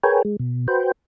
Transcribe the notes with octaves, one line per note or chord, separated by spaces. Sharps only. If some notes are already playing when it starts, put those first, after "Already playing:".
G#4 A#4 B4 C#5 G5 G#5
G#3
B2
F#4 B4 C5 G5